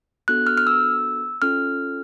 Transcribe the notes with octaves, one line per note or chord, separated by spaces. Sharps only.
B3 D4 F#4 A4 F#6
F6
F6
E6
C#4 F4 A4 F6